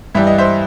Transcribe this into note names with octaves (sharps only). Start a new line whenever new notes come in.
G2 E3 G3 E5
D#5
C5 E5